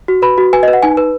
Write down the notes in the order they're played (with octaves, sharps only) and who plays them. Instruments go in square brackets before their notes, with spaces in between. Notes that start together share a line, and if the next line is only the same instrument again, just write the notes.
[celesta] F#4
B4 B5
F#4
B4 G#5
D#5
B4
F#5
D#4 G#5
B4